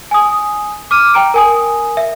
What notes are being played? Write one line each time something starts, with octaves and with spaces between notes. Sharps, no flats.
G#5 D#6
D6 F6 D#7
G5 A#5 D7
A#4 G#5 D#6
E5